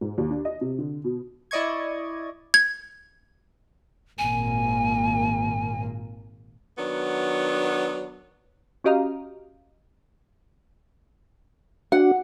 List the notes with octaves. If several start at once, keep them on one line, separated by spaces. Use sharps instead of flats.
G#2
D#2
D4
D#5
C3
D3
B2
E4 D5 D#5 C#6 G#6
G#6
G#1 A#2 A#3 G#5
D#3 F#3 B3 D4
C#4 F#4 G4 D#5 F5 A#5
D4 F#4 F#5